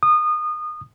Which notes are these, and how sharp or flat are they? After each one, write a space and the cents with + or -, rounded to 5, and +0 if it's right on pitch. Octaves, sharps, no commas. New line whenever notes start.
D#6 -25